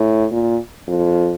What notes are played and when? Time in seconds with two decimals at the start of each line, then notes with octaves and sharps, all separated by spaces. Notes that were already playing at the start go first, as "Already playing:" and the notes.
Already playing: A2
0.31 A#2
0.88 F2